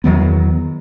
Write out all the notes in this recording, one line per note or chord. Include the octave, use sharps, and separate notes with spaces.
E2 D#3 F#3 B3